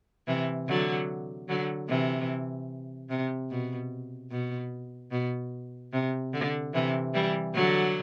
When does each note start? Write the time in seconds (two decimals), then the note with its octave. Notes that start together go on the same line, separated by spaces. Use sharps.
0.27 C3 E3
0.68 D3 F#3
1.49 D3 F#3
1.89 C3 E3
3.10 C3
3.50 B2
4.31 B2
5.12 B2
5.93 C3
6.33 D3
6.74 C3 E3
7.14 E3 G3
7.54 D3 F#3